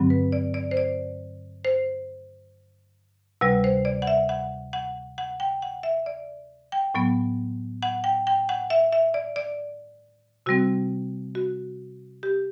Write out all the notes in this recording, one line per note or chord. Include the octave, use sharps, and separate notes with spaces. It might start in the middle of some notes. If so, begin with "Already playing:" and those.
Already playing: G2 D3 F#3 C4
B4
D5
D5
C5
D5
C5
D2 C3 G3 B4
C5
D5
F#5
E5
F#5
F#5
F#5
G5
F#5
E5
D5
G5
A2 F#3 B3
F#5
G5
G5
F#5
E5
E5
D5
D5
C3 G3 C4 F#4
F#4
G4